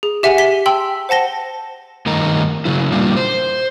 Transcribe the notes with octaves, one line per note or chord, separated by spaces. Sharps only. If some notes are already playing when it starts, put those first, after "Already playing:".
G#4
G4 E5 F#5 G#5 F7
B6 G7
G5 A5 C6 E6 F#7
C5 F#5 A5 A#6 G7
G2 D#3 A3 A#4 D#5 A#5
C#3 F#3 E4
G2 A#2 G3 A#3 D4 F4
C5